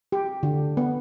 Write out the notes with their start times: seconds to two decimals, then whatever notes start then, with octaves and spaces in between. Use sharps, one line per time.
0.12 G4
0.43 D3
0.77 B3